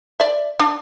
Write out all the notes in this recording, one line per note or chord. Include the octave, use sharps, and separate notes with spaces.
D5 E5
D4